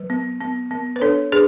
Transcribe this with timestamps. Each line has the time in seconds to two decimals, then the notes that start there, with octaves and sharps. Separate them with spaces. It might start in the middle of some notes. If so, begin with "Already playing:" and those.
Already playing: F#3 B4
0.10 B3
0.41 B3
0.71 B3
0.96 B4
1.01 D4 A4 C#5
1.32 D4 G#4 B4